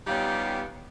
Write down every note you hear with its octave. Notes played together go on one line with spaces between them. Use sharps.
G3 B3 C#4 D#4 F4 G4